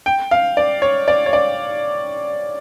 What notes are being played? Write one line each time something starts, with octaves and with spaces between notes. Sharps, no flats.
G5
F5
D5
C#5
D5
C#5
D5